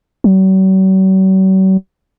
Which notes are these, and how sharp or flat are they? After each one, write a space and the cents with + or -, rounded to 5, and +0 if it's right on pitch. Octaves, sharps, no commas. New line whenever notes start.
F#3 +45